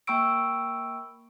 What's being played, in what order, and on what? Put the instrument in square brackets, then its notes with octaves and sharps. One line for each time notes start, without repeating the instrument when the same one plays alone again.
[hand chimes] A#3 G5 B5 C#6 E6 D7